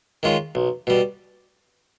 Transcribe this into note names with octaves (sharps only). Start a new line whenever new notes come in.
D#3 G#3 C#4 F4
B1
B2 G3